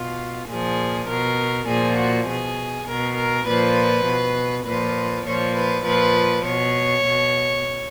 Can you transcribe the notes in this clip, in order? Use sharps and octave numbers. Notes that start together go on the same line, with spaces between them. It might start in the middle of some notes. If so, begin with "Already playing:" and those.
Already playing: B2 F4
A#2 F3 G#4
B2 A#4
A#2 F3 G#4
F#4
B2 G#4
B2 A#4
A#4
A#2 F3 B4
B2
A#2 F3 B4
A#2 F3 C#5
B4
A#2 F3 B4
B2 C#5
B2